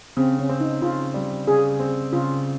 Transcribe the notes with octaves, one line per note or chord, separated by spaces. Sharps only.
C#3 C4
C#4
C4
D#4
C#3 F4
G3
C#3 G#4
C4
C#3 F4